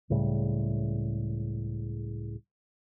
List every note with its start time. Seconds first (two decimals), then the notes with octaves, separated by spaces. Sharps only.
0.10 C#2 A2 C#3 G3